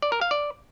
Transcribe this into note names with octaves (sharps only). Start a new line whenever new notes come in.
D5
A#4
F5
D5